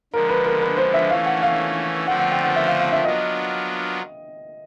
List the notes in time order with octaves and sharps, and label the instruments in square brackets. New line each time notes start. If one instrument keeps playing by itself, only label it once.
[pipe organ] D3 F3 G#3 [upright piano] A#4
[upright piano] B4
A#4
B4
C5
E5
[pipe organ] E3 A3 C#4 [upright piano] F5
[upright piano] F#5
F5
[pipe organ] D3 F3 A3 C4 F4 [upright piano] F#5
[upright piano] F#5
G5
F#5
E5
F5
F5
E5
[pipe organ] F#3 B3 D4 F4 A#4 [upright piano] D#5